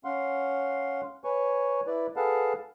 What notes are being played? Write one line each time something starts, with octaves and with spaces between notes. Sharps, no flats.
C#4 F5 F#5 C6
B4 C#5 G#5 C#6
E4 B4 D5
G#4 A4 B4 F5 F#5 A5